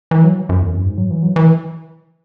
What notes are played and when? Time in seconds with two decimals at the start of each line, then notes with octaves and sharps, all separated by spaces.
0.11 E3
0.24 F#3
0.49 F#2
0.61 E2
0.73 F#2
0.85 G#2
0.98 F#3
1.10 E3
1.23 F#3
1.36 E3